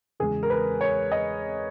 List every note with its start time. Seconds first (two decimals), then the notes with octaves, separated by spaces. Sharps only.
0.20 E2 C#3 G#3 G#4
0.43 A#4
0.50 B4
0.81 C#5
1.12 D#5